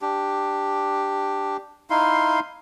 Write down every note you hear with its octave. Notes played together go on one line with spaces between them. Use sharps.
D4 G4
D#4 E4 F5 C6